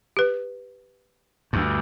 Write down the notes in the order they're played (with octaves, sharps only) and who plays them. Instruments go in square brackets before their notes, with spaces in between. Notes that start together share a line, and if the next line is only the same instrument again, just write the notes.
[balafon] G4 B4
[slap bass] D2 G2